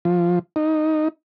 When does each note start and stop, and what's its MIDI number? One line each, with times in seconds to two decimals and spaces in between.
0.05 0.39 53
0.56 1.08 63